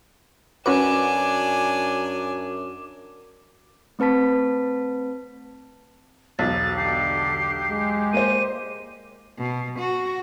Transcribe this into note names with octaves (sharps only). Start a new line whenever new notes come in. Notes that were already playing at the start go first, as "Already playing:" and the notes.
F#2 C#4 D4 F#4 B4 G#5 D6
A3 C4 B4 A5 B6
E1 B1 A6
D3 G4 C7
G#3
A#3 C5 D#7
B2
F#4